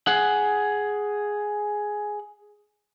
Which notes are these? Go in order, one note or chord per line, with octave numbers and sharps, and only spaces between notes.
G#4 F#5